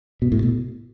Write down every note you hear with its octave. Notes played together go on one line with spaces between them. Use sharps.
B2
A2
B2